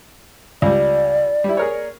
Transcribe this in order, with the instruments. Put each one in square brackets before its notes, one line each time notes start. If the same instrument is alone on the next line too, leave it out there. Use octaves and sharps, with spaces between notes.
[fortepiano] C#2 G3 [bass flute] D5
[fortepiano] G3 E4
G#4 A#4 C#5